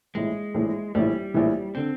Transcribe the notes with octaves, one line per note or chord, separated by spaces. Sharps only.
A#1 A2 E3 G#3
A#1 A2 E3
A#1 A2 E3 G3
A#1 A2 E3
D3 C4